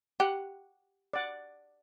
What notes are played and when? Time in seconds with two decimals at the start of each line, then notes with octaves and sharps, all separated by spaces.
0.20 G4 F#5
1.13 D5 F#5